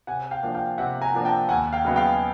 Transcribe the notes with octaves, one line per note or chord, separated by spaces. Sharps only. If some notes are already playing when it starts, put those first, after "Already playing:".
C3 F#5 G#5
F5 G5
F3 A#3 D4
F5 G5
C3 E5 F#5
G#5 A#5
F3 A#3 D4
G5 A5
D#2 F#5 G#5
F5 G5
C#3 F#3 B3 D#4
F5 G5